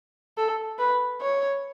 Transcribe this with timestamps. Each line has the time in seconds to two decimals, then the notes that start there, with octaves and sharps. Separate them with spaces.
0.38 A4
0.79 B4
1.21 C#5